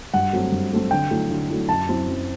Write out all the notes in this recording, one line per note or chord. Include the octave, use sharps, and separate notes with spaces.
G2 F#5
F#3 A3 C4
G2
F#3 A3 C4
D3 G5
F#3 A3 E4
D3
F#3 A3 E4
F#2 A5
F#3 C4 E4
F#2